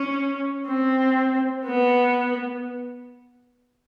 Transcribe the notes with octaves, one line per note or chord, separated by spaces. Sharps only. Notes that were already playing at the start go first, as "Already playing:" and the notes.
Already playing: C#4
C4
B3